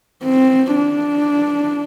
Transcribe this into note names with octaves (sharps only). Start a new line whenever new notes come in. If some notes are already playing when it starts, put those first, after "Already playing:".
C4
D4